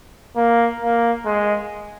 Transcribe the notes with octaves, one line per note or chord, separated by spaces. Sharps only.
A#3
A#3
G#3